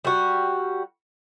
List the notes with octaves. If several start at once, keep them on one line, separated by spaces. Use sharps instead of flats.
G3 F#4